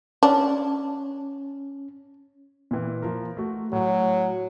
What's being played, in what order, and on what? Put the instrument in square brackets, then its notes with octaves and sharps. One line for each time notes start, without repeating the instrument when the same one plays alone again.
[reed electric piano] C#4 [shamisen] D4
[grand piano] A#2 E3
F3 A#4
A3 F#4
[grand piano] A2 [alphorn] F#3